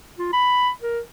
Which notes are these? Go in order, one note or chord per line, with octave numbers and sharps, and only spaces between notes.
F4
B5
A#4